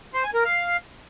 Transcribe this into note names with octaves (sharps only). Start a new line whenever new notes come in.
C5
G#5
A#4
F5